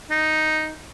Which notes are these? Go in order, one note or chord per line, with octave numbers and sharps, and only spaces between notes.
D#4